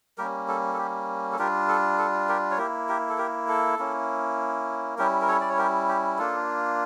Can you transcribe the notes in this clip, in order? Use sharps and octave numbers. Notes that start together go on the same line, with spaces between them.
G3 A#3 C#4 G4 A#4
A4
A4
G4
A4
G3 D4 F4 G4 A#4
A4
A4
G4 A#4
C#5
A#3 E4 G4 A#4
G4 A#4
A4
G4 A#4
A4
A#3 C#4 E4
G3 C#4 E4 G4 A#4
A#4
A4 C#5
D5
C#5
G4 A#4
G4
A#3 D4 F4 A4